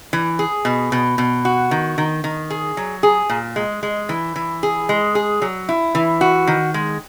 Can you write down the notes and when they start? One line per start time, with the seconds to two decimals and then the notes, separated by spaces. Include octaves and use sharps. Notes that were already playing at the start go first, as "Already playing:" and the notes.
0.13 E3
0.39 G#4
0.65 B2
0.92 B2
1.18 B2
1.45 F#4
1.71 D#3
1.98 D#3
2.24 D#3
2.50 G#4
2.77 F#3
3.03 G#4
3.29 A#2
3.56 G#3
3.83 G#3
4.09 E3
4.36 E3
4.63 G#4
4.89 G#3
5.15 G#4
5.42 F#3
5.69 E4
5.95 E3
6.21 F#4
6.47 D#3
6.74 G#3